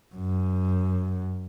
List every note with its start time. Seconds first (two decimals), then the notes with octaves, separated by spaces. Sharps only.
0.15 F#2